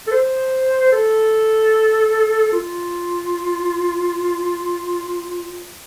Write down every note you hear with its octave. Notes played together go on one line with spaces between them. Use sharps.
A4
C5
A4
F4